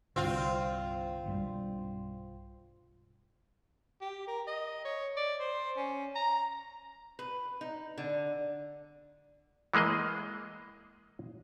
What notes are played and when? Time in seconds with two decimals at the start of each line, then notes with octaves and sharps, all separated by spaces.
0.16 C2 G2 D3 C4 F4
1.26 B1 G2 G3
4.01 G4
4.27 A#4
4.47 D#5
4.85 C#5
5.17 D5
5.40 C5
5.76 C#4
6.15 A#5
7.19 B4
7.61 D#4
7.98 D3
9.74 E3 G#3 A#3 G#4 D#5